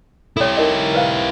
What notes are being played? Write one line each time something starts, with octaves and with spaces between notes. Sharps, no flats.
E4 G4 A4 C#5
D#4 A#4 D#5
B4 C5 F5